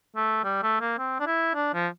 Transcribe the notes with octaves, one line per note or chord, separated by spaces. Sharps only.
A3
G3
A3
A#3
C4
D4
E4
D4
F3